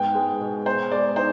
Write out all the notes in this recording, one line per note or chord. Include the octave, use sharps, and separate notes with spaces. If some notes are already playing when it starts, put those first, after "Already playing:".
Already playing: G#2 B3 G5
G#3
B2
B3 C5
G#3 D5
D#4 C5